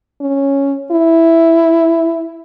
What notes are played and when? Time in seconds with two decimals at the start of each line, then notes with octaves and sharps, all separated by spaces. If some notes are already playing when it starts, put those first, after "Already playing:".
0.21 C#4
0.92 E4